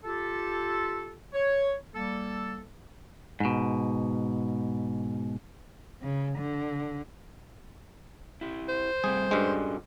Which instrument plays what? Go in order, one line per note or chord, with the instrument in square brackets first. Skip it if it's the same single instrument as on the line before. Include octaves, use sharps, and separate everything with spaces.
[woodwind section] F4 G4 A4
C#5
G3 A#3 A4
[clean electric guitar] G#2 B2
[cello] C#3
D3
[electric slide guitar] E4 G4
[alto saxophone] C5
[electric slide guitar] G3 A3 C4 [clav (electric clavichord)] G#4
[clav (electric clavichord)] G2 G3 G#3 [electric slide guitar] C#4 F#4 A4